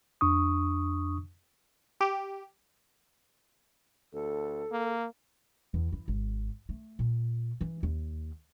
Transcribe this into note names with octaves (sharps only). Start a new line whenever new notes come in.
F2 D4 C#6 D#6
G4
D2 A4
A#3
E2
E3
G#1
A3
A#2
E3
D#2